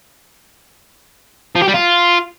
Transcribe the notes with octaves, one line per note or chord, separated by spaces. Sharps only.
F3
G4
G3
F4